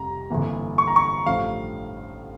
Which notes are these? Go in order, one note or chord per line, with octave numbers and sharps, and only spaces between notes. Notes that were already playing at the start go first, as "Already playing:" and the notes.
Already playing: F1 F2 G3 A#5
G1 F2 E3 A#3
C#6
A#5
C#6
A1 G2 D3 F3 A3 F5